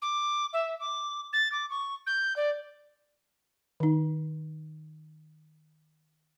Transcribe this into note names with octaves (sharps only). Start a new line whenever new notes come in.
D6
E5
D6
A6
D6
C#6
G6
D5
D#3 D#4